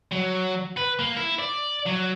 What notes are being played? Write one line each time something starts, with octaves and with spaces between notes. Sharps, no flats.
F#3
B4
A#3
E4
D5
F#3